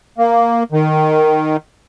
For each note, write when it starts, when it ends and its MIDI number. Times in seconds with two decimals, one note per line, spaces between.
0.18 0.63 58
0.72 1.57 51